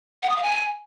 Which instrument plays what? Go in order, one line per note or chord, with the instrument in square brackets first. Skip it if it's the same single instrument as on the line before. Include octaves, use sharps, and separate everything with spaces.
[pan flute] F#5
D#6
F5
G#5